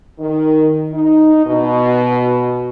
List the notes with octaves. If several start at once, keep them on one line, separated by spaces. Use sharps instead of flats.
D#3
D#4
B2